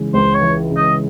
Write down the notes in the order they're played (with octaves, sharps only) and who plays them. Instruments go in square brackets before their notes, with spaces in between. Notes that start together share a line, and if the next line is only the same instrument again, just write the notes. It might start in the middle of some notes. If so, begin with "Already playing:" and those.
Already playing: [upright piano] C#3 E3 G#3
[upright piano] C#2 [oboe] C5
[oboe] C#5
[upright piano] E3
C#3
[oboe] D#5